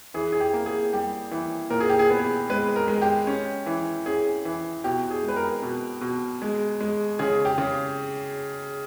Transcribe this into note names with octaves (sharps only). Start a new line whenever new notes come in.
E3 G#4
G#4
G4
A#3
G#4
G3 G4
E3
A#2 A#4
G#4
G4
G#4
B3 G#4
G#3 B4
A#4
G#3
G4
C#4
E3
C#4 G#4
E3
B2 G4
G#4
G#3
B4
A#4
B2
B2
G#3
G#3
C#3 G#4
G4
C#3